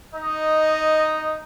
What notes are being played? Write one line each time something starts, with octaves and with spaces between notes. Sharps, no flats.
D#4 D#5